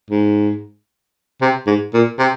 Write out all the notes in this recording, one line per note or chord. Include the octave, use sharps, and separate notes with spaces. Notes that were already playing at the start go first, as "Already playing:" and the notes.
G#2
C3
G#2
A#2
C3